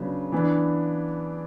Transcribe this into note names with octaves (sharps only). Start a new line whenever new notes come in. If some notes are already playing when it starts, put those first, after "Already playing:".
Already playing: C#3 F#3 B3 D4
E3 B3 D4